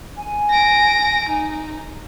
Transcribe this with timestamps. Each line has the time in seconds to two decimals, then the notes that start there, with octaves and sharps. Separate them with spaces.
0.17 G#5
0.51 A#6 D7
1.29 D#4